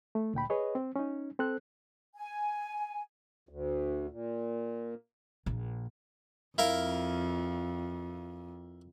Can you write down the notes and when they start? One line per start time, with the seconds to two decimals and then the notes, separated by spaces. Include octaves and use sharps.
0.15 A3
0.34 D2 A#2 G5 B5
0.50 G#4 B4 C#5 D#5
0.75 C4
0.96 C#4 D#4
1.39 C4 A4 C5 F#6
2.15 G#5
3.49 D2
4.10 A#2
5.46 A#1
6.58 F2 E4 A#4 F5